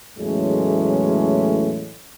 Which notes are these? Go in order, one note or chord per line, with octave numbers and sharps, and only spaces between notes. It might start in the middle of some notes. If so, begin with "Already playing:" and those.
E2 A2 F#3 G#3 A3 C#4